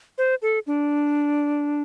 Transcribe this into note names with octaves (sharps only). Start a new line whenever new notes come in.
C5
A4
D4